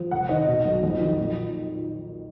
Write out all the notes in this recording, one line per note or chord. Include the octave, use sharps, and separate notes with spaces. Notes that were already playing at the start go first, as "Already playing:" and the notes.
Already playing: F3
F1 F#5
D#3 D#5
B2
B1
F2
D#3
A#2